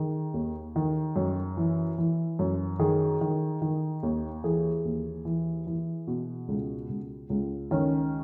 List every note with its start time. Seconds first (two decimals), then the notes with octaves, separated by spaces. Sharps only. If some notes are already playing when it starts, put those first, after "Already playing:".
Already playing: D#3 G#4
0.34 D#2
0.76 D#3
1.16 F#2
1.57 E3
1.98 E3
2.39 F#2
2.79 D#3 G#4
3.21 D#3
3.62 D#3
4.03 D#2
4.44 E3 G#4
4.85 D#2
5.25 E3
5.67 E3
6.07 B2
6.48 C#2
6.89 C#2
7.30 C#2
7.71 D#3 C#4